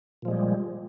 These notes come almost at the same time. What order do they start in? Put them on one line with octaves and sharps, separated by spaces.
A#2 F3 G#3 G3